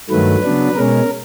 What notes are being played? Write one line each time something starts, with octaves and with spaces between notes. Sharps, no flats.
G2 D#3 F#3 A3 B4
C#3 F#3 B3 D4
B2 G#3 C#4 A#4